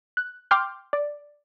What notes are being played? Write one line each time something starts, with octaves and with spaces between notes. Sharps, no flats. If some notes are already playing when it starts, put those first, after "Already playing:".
F#6
G5 C6 D6 F6 G6
D5